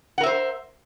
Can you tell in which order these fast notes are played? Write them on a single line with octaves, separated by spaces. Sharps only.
F#5 A#4 E5 C5